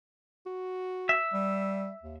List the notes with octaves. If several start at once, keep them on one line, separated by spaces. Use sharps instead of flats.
F#4
E5
G3
D#2